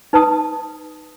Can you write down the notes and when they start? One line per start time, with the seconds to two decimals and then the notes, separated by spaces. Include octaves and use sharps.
0.13 D#4 B4 A5 D#6